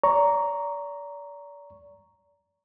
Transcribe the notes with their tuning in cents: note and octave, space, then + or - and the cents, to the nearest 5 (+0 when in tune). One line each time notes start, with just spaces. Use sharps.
D5 -35 A#5 +0 C#6 +0